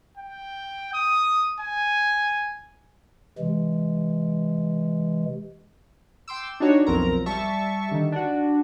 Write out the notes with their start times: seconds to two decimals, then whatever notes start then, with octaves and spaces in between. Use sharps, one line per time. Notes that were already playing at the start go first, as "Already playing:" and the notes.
0.18 G5
0.94 D#6
1.60 G#5
3.39 C3 E3 G#3
6.28 G5 C6 D6 E6
6.60 D4 D#4 F#4 C#5
6.87 B1 F2 C4 A#4 A#5
7.26 G3 E5 A5 C#6
7.91 D3 D#3
8.12 D4 F#4